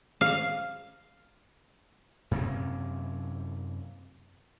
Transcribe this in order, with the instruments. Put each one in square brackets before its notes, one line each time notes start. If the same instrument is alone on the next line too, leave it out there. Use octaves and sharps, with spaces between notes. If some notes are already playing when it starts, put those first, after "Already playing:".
[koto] F5
[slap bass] F#2 C3 A#3 C#4